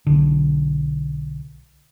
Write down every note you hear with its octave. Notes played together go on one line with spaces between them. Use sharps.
B1 D3